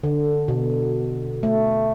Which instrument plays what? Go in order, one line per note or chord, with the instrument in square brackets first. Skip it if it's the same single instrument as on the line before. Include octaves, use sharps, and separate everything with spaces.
[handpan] D3
B2
A3